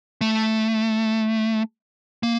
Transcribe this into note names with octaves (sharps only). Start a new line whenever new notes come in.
A3
A#3